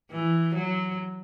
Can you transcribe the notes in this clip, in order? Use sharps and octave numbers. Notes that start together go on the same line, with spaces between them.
E3
F#3